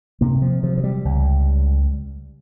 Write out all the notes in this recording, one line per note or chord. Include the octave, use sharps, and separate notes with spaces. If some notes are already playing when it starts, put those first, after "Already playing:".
C3 A#3
F3
C3 F3
F3
G3
C#2